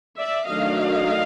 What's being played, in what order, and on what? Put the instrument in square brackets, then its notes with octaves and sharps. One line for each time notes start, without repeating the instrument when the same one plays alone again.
[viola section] D5 E5
D#3 F#3 A3 D4 D#5 F5